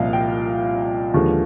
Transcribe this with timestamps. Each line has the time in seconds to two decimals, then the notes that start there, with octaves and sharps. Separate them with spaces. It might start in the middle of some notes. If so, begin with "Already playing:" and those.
Already playing: C2 A#2 F3 D#5 F5
0.13 G5
1.14 D#2 D3 F3 G#3